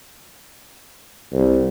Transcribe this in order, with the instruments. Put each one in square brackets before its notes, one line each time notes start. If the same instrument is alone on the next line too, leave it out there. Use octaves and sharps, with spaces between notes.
[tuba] C2